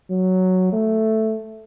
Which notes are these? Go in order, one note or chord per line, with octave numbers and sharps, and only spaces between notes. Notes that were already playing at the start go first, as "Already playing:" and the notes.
F#3
A3